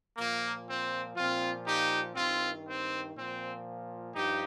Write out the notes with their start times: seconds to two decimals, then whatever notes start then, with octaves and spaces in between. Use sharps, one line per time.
0.17 A#2 F3 A#3
0.67 C4
1.16 A#2 F3 C4 F4
1.67 D#4 G4
2.15 G2 D#3 C4 F4
2.65 C4
3.15 A#2 F3 C4
4.14 G2 F3 D#4 G4